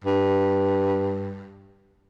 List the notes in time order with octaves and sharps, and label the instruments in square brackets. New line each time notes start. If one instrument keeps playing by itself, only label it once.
[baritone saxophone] G2